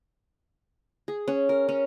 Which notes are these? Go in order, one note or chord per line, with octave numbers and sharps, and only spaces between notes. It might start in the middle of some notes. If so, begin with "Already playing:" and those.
G#4
C#4
A#4
C#4